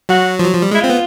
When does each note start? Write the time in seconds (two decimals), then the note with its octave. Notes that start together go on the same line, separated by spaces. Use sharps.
0.09 F#3 F#4
0.39 F3
0.45 F#3
0.54 F3
0.62 G3
0.71 G#3
0.75 E4
0.81 C4 F4
0.90 B3